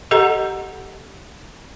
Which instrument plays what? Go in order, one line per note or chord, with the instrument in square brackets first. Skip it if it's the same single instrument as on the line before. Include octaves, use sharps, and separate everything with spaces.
[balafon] G4 A4 D#5 F#5 A#5